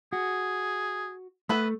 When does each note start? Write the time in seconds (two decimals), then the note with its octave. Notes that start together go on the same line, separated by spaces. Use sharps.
0.13 F#4 G#4
1.49 A3 B3 B4 E5